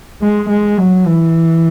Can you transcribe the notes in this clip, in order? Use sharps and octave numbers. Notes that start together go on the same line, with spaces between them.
G#3
G#3
F#3
E3